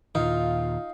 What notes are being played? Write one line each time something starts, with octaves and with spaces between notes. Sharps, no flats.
D#2 A#2 D#3 D#4 F4 F5